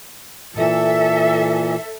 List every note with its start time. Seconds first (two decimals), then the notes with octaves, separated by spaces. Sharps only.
0.55 A#2 E3 A4 E5